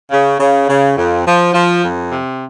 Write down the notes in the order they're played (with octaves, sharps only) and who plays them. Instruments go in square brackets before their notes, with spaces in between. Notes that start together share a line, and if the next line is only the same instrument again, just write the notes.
[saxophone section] C#3
C#3
C#3
F2
F3
F3
F2
C3